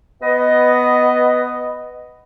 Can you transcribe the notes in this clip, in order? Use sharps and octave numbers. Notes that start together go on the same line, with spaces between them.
B3 B4 D#5